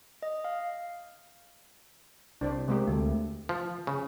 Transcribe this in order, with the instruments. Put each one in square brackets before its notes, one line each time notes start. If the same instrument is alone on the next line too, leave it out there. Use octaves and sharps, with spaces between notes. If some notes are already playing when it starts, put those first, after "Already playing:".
[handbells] D#5
F5
[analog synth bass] C2 [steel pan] D4 C5 D5
[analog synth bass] C3 [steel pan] G#3 A#3 G4
[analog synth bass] D2 [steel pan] A3
[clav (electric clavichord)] F3
C#3